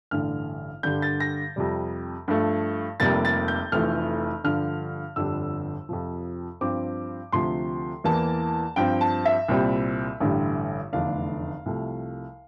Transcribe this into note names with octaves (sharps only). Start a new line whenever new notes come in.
A1 G2 D3 F6
G2 D3 G3 G6
A6
A#6
F2 C3 G3
G2 F3 A3
F1 F2 C3 G3 A#3 A6
A6
G6
F1 F2 E3 A3 F6
G2 D3 F3 F6
G1 F2 D3 G3 D4 E6
F2 C3 F3
G2 F3 C4 D6
D2 C3 F3 C6
E2 E3 A#3 A5
G2 F3 C4 G5
A5
E5
C2 A#2 G3 C4
A1 G2 D3 G3
F1 E2 D3 A3 D4 F5
C2 C3 F3 A3